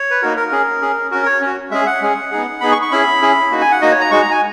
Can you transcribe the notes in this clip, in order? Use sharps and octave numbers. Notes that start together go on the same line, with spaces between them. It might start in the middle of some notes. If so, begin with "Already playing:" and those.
Already playing: C#5
B4
A#3 D#4 F#4 A#4
A#4
C#4 G#4
C#4 G#4
C#4 F#4 A#4
C#5
C#4
F#4
G#3 C#4 G#4 E5
F#5
G#3 C#4 G#4
B3 D#4 G#4
B3 D#4 G#4 B5
C#6
C#6
C#4 E4 G#4 B5
C#4 E4 G#4
A#3 D#4 F#4
G#5
F#5
A#3 D#4 F#4 D#5
C#5
A#5
G#3 D#4 F#4 C#6
A#5
G#5